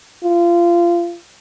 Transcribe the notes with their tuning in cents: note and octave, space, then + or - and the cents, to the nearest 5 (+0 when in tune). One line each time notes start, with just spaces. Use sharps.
F4 -25